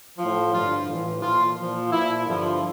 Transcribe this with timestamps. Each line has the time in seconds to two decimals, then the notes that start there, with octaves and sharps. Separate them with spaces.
0.19 A2 F3
0.53 G2 D3 F3 F4
0.88 A2 E3
1.22 A#2 F3 F4
1.57 A#2 F3
1.92 A#2 F3 E4
2.27 G2 D3 F3